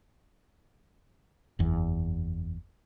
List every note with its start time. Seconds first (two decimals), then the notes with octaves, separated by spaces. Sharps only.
1.59 F#1 E2